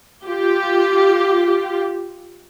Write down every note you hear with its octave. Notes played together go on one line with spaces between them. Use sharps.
F4 G4